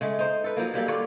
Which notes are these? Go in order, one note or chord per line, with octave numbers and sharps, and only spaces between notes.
C#3 G#3 A3
D#4 C5
A4 B4
F3 F#3 A#3
F#3 G3 A#3 A4
D3 F4 C#5 D5